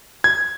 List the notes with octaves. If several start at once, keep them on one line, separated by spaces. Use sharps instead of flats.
G#6